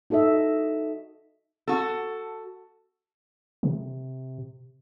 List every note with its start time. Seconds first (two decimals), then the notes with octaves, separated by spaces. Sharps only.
0.10 D#4 F#4 A4 D#5 E5
1.68 F#4 A4
3.63 C3